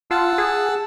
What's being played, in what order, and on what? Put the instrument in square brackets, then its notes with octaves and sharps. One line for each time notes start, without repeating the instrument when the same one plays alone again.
[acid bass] F4 [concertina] F#5 A5 E6
[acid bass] G#4